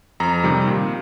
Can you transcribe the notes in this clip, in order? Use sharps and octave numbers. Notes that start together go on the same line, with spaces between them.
F2 A#5
C3 D#3 G3
A#2